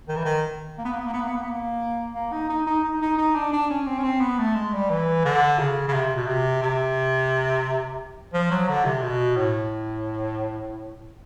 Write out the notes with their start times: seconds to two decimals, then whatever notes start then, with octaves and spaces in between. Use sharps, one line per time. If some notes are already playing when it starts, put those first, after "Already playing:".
0.08 D#3
0.16 E3
0.25 D#3
0.78 A#3
0.85 B3
0.92 A#3
0.99 B3
1.06 A#3
1.13 B3
1.21 A#3
1.28 B3
1.36 A#3
1.43 B3
1.50 A#3
2.15 A#3
2.32 D#4
2.49 D#4
2.66 D#4
2.84 D#4
3.01 D#4
3.17 D#4
3.35 D4
3.53 D4
3.70 C#4
3.86 C4
3.98 C#4
4.03 C4
4.21 B3
4.39 A3
4.55 G#3
4.73 G3
4.90 E3
5.25 D3
5.59 C#3
5.88 C#3
5.93 C3
6.16 B2
6.27 C3
6.62 C3
8.33 F3
8.51 F#3
8.69 D3
8.85 C3
9.03 B2
9.36 A2